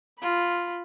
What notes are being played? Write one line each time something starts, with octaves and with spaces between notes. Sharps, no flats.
F4 B5